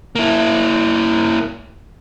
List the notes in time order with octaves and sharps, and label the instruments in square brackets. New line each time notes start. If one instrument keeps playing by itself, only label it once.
[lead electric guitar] A#3 E4